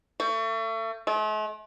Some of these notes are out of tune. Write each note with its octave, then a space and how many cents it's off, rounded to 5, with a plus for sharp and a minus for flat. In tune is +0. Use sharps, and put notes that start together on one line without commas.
A3 +35
A3 -45